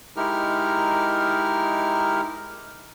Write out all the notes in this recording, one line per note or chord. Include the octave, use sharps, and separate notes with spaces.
G#3 D#4 E4 G4 A#4 F6